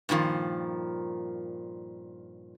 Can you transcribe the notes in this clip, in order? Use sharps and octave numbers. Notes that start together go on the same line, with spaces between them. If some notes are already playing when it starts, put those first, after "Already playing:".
G2 A#2 D#3 F3